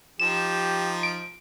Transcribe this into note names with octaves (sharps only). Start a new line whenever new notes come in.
F3 D#4 G4 E7
D7